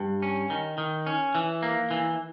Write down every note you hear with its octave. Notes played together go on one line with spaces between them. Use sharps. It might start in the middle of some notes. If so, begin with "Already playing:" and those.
Already playing: G2
C#4
D#3
D#3
C#4
E3
A#3
E3